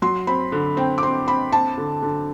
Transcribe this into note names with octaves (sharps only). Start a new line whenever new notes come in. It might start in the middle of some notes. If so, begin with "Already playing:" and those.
F#3 C6
C4 B5
D3
C4 G5
D6
C4 C6
C4 B5
C4 A5
D3
D3